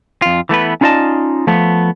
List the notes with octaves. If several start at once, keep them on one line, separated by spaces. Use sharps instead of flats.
F2 F4
E3 A3 B3 B4
C#4 D#4 F4 D5 D#5 A5
F3 A3 B3